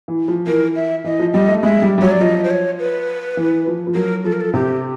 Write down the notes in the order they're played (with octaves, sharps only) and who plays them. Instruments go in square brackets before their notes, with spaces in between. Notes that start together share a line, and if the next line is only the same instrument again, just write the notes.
[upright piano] E3
F3
[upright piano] E3 [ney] A#4
[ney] E5
[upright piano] E3 [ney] D#5
[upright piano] F3
[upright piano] G3 [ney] D#5
[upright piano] A3
[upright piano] G#3 [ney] E5
[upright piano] G3
G3
[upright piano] F#3 [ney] C#5
[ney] D5
[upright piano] F3 [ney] D#5
[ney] C5
C#5
B4
[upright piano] E3
F3
F3
[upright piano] F#3 [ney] A#4
[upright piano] F3 [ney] A4
[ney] A#4
A4
[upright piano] C3 [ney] G4